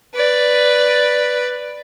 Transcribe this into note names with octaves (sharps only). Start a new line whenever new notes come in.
B4 D5